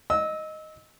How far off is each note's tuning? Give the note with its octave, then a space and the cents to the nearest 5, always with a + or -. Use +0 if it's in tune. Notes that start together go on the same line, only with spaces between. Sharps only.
D#5 +0 E6 -25